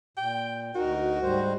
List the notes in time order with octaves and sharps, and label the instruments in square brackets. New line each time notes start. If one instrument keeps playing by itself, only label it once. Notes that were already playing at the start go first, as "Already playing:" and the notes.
[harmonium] A#2 [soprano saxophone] G5
[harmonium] D2 D#4 A#4 [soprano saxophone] F#4
[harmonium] G#2 G3 C5